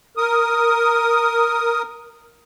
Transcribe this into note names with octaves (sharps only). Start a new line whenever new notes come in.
A#4 D#6